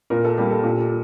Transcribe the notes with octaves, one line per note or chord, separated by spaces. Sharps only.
A#2 A#4
A4
G3 A#3 G4
A4
A#2